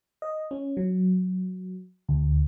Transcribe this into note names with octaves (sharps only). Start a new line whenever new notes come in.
D#5
C#4
F#3
D2